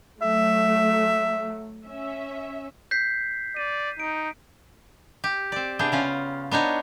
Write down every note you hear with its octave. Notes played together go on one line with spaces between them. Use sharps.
F#3 A3 E5
C#4 E5
G6 B6 C7
D5 D#7
D#4 D7
G4
C4 D5
C3 B3 D4 G#4 G5
C#3 C#4 F4
B3 D4 D#4 C#5